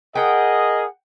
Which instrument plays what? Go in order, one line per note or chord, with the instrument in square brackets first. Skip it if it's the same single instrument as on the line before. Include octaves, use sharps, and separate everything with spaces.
[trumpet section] G#4 A#4 D#5 [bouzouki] F#5 G5